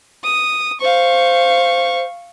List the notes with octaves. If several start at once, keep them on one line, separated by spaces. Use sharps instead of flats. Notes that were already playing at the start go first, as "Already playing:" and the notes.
D#6
C5 F5 C#6